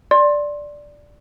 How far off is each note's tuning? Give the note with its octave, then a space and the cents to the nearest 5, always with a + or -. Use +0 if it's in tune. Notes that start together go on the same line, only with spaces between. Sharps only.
D5 +0 C6 +20